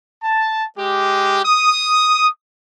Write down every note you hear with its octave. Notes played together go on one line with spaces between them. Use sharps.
A5
G#3 G4
D#6